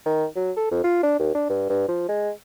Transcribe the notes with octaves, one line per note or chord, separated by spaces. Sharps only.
D#3
F#3
A4
F2
F4
D4
D#2
D4
G2
G2
F3
G#3